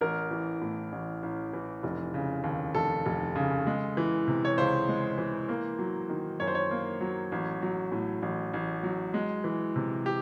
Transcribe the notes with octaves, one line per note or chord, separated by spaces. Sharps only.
A1 A#4
E3
A2
A1
A1
E3
F1
C#3
D#2
F1 A4
F1
C#3
G#3
E3
C3
C#5
C#2 C5
G#3
E3
A#3
F#3
D#3
F#2 C#5
C5
C#5
A#3
F#3
A1
F#3
A2
A1
A1
F#3
G#3
E3
C3
G4